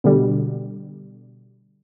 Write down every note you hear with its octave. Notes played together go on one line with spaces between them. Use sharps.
B2 D3 G3